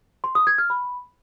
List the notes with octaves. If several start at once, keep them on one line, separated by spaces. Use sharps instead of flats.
C6
D#6
G#6
F6
B5